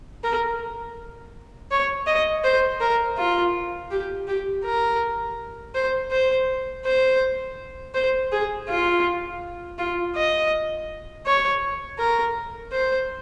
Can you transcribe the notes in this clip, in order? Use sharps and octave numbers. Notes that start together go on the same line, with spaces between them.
A#4
C#5
D#5
C5
A#4
F4
G4
G4
A#4
C5
C5
C5
C5
G#4
F4
F4
D#5
C#5
A#4
C5